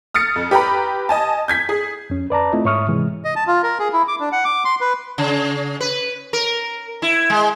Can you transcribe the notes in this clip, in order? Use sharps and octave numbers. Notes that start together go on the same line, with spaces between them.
D#6 F6 A6 C#7
F2
G4 B4 G5 A#5 B5
D#5 G#5 A5
G6 G#6 B6
G#4
F2 C#4
B4 D5 A5 A#5
A3 C4 E4 F4 D#5
G#2 C#5 E5 C#6 D#6 F6
C3 E3 G#3
D#5
A5
F4
A#4
G#4
E4
D6
D4
F#5
D6
C6
B4
C#3
B4
A#4
E4
G#3